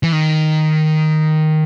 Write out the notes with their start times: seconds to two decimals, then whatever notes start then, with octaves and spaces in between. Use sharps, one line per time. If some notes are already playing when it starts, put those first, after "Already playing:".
0.03 E3
0.13 D#3